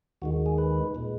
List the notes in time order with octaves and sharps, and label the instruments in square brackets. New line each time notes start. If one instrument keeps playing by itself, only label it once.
[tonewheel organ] D#2 D#3 G#3 F#4
G#4
B4
A#2 G#3